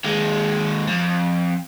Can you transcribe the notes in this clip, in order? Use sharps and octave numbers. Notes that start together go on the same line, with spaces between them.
D#2 G#3
F2